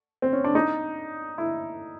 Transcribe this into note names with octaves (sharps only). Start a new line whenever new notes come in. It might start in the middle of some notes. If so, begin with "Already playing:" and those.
C4
C#4
D4
D#4
E4